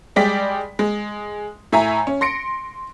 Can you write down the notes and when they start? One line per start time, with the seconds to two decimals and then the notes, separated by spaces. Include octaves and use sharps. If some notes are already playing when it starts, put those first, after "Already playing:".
0.16 G3 G#3 D5 G5 B6
0.79 G#3
1.72 A2 E5 G#5 A#5
2.07 C#4
2.21 C6 A#6 C#7 D7